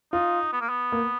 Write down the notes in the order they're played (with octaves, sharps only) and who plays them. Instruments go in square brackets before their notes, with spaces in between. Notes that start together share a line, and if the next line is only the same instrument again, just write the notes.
[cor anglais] D#4 [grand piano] F4
[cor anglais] B3
A#3
B3
[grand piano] A#3